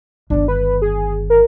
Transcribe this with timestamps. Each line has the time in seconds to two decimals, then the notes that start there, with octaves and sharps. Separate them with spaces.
0.30 G1 D#3 D4
0.48 B4
0.82 G#4
1.30 A#4